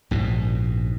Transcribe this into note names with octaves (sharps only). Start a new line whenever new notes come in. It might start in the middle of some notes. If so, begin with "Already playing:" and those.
A#1 G#2 B2